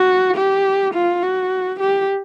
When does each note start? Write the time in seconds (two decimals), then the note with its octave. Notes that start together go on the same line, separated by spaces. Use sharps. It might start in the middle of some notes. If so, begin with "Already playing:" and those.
Already playing: F#4
0.36 G4
0.94 F4
1.23 F#4
1.80 G4